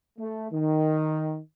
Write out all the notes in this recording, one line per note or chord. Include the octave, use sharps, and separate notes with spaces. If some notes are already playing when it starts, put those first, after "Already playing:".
A3
D#3